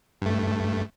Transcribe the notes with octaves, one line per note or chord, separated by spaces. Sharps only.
G2 A3